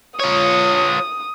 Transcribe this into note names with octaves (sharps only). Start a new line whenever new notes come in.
F4 C#5 D#6